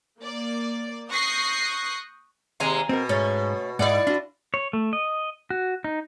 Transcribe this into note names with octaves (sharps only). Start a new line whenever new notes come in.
A#3 D5
C#6 D#6 F#6 G6 A#6 C7
D#2 C3 G#3 F5 G#5 A#5
B2 C4 A#4
G#2 A3 C#4
G#2 D#4 E4 D5 F#5
D4 F4 F#4
C#5
A3
D#5
F#4
D#4